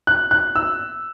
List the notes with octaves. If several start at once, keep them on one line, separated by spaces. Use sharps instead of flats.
F#6
F#6
E6